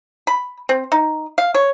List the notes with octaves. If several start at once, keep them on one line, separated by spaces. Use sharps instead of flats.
B5
C4
D#4
F5
C#5